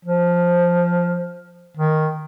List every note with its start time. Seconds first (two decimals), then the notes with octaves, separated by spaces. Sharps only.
0.05 F3
1.77 D#3